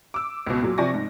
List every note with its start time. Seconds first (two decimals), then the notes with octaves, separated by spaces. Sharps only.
0.14 D6 E6
0.46 C#2 B2
0.62 A#2 F#3
0.78 C3 F3 D5 G#5 C#6 A#6
0.94 G#2